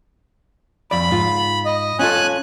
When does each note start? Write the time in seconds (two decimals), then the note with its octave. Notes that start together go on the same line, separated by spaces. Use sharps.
0.91 F2 D5 B5
1.11 G#2 F4
1.65 D#5
1.99 C#4 F4 A4 G#5 F#6